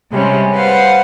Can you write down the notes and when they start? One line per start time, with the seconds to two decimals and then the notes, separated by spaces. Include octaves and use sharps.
0.12 C3 G3 G#3 C#4
0.54 B4 C5 F5 F#5